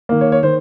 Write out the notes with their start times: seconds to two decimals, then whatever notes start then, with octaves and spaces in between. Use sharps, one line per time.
0.09 D#3 A#3
0.21 C#5
0.32 C#5
0.43 D#3 C5